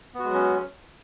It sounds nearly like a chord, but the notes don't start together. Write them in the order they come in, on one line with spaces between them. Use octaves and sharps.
B3 F#4 G#3 F#3 C#4